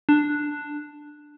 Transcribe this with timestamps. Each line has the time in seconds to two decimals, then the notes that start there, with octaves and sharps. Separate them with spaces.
0.09 D4